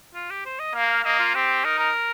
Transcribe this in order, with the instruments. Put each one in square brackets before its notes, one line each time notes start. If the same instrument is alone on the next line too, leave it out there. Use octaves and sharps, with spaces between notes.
[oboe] F4
G4
C5
D#5
[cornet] A#3 [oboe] F5
[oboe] F5
[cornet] A#3 [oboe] D#5
[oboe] F4
[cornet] C4 [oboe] G4
[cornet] D#4 [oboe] A#4
[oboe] A#4